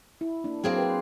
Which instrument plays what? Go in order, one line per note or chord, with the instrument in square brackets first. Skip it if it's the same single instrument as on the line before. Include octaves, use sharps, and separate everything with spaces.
[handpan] E4
A#3 D4
[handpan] F#3 [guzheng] A#3 C4 G#4
[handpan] B4 C5